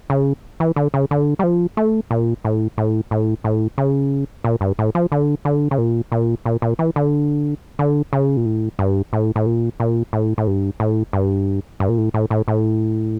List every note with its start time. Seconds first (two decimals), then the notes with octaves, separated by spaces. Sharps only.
0.10 C#3
0.60 E3
0.76 D3
0.94 C#3
1.11 D3
1.39 G3
1.43 F3
1.77 A3
2.11 A#2
2.44 A2
2.78 A2
3.11 A2
3.44 A2
3.78 C#3
4.44 A#2
4.61 G2
4.79 A2
4.95 F3
5.12 D3
5.45 D3
5.71 C#3
5.78 A#2
6.12 A#2
6.45 A#2
6.62 A#2
6.79 E3
6.96 D3
7.79 D3
8.13 C#3
8.37 A#2
8.46 A2
8.79 G2
9.13 A2
9.36 A2
9.46 A#2
9.80 A#2
10.13 A2
10.38 A2
10.47 G2
10.80 A2
11.13 G2
11.80 G2
11.89 A#2
11.98 A2
12.14 A2
12.30 A2
12.48 A2